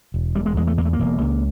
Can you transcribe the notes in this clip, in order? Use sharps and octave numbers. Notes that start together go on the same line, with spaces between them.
E1
E1 G3
G#3
E2 G#3
A3
E2 A#3
A3
A#3
E1
C#2